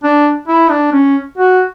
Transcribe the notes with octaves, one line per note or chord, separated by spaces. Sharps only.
D4
E4
D4
C#4
F#4